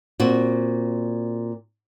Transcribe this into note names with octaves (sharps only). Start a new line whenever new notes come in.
A#2 C4 F#4